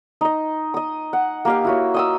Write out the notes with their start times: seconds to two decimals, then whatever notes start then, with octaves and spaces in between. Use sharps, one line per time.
0.21 D#4 D#5
0.74 D#5 D#6
1.13 F#5
1.45 A#3 G4 F5
1.65 E4 F#4 C#5
1.94 D#5 D#6 E6